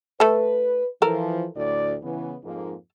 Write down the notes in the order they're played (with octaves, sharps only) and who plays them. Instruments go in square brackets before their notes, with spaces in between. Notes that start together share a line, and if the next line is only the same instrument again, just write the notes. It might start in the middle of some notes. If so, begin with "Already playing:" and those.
[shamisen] A3 A4 [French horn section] B4
[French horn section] E3 F3 [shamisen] A4 A#4
[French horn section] D2 A2 D5
C#3 E3 B3
F2 G#2 A#3